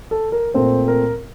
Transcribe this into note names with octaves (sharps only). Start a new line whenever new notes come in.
A4
A#4
A#2 A3 C4 C5
A#4